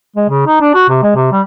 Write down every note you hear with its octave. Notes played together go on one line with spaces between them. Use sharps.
G#3
C#3
D#4
D4
F#4
C3
G#3
C3
G3